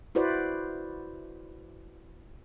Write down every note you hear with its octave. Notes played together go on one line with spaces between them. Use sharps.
E4 F#4 B4 C5 D5